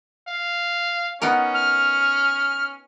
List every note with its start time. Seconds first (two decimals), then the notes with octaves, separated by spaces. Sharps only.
0.28 F5
1.22 B3 C#4 D#4 A#4
1.54 F6